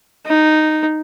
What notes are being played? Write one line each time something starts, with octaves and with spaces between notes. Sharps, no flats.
D#4